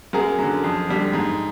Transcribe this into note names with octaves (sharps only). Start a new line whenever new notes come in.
F#2 G#4 A#4
D3 F#3
F2
D3 G3
G#2